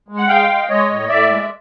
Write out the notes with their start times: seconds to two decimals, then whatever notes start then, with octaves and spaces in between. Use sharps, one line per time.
0.08 G#3
0.17 F#5
0.28 G#3 F5 G5
0.49 G#3
0.69 G#3 C#5 D#5
0.89 A2
1.08 A2 D5 E5
1.29 G#3